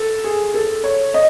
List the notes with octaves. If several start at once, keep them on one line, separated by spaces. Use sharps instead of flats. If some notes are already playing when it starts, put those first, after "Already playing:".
Already playing: A4
G#4
A4
C#5
D#5